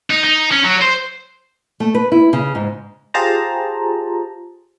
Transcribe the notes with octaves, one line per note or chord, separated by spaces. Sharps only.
D#4
D#4
C#4
F#3
C5
A3
B4
E4
C#3
G#2
F4 G4 G#4 C5 A5 A#5